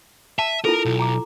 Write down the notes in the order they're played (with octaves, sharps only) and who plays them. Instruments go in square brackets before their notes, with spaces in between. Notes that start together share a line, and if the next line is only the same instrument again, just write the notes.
[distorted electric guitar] E5 [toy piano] A5
[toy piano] E4 F4 A4 [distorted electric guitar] A#4
[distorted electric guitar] B1
[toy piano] A#5 D6